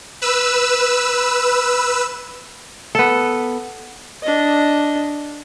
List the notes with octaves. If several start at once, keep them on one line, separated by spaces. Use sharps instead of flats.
B4 E6
B3 A4
D4 D#5